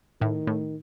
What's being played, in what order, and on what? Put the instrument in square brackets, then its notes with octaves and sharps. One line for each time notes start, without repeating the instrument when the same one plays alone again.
[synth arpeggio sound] A2 [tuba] D#3
[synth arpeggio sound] A2